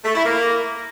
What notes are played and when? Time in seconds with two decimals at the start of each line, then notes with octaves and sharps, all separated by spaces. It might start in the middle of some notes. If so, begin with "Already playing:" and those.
0.05 A3
0.15 E4
0.26 A#3